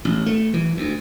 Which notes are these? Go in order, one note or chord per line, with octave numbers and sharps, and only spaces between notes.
A1
A3
E3
D2